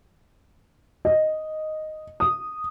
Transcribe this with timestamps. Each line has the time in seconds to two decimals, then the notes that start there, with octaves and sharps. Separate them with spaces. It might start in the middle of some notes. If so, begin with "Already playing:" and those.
1.05 D#5
2.20 D#6